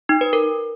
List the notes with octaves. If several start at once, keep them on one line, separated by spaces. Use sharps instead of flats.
D#4
B4
A#4